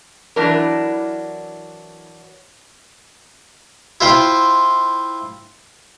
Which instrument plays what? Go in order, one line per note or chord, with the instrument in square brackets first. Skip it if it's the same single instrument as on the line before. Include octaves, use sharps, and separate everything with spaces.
[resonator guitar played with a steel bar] E3 F#3 D4 E4 A#4
[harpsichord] E4 F4 C5 G5